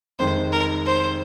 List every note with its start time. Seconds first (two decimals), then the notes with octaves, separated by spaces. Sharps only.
0.19 F1 F2 D#3 G#3 C5
0.52 A#4
0.86 C5